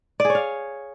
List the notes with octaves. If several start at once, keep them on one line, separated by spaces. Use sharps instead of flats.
D5
G#4
C#5
F5